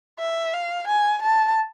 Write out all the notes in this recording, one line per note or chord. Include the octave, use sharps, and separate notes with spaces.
E5
F5
G#5
A5